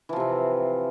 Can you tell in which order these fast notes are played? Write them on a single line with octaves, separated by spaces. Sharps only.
E3 F3 C3 C4